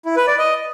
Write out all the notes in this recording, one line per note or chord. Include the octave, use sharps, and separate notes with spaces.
E4
B4
D5
D#5